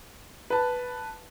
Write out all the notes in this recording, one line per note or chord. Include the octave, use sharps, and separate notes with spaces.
B4 A5